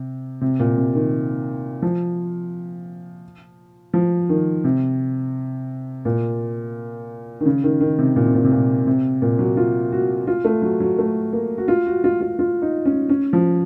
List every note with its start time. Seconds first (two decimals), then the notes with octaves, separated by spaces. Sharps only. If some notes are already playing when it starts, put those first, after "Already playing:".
Already playing: C3
0.41 C3
0.59 A#2
0.78 C3
0.95 D#3
1.82 F3
3.94 F3
4.29 D#3
4.64 C3
6.05 A#2
7.40 D#3
7.46 C#3
7.63 D#3
7.81 D#3
7.99 C3
8.16 A#2
8.26 C3
8.35 A#2
8.44 C3
8.52 A#2
8.87 C3
9.22 A#2
9.39 F#3
9.57 F4
9.92 F#4
10.27 F4
10.45 A3
10.62 F#3
10.80 F#3
10.98 A3
11.33 A#3
11.58 F#4
11.68 F4
11.86 F#4
12.04 F4
12.21 F4
12.39 F4
12.62 D#4
12.85 C#4
13.09 C#4
13.33 F3